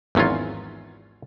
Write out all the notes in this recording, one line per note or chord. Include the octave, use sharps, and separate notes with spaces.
G#1 E2 F#3 C#4 F4